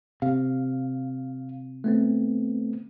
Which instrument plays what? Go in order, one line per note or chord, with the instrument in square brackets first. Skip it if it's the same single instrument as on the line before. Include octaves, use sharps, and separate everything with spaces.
[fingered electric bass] C3 [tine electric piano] F5
[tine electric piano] A3 B3 C4